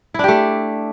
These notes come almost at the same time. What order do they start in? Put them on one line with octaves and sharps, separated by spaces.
E4 D4 G4 A3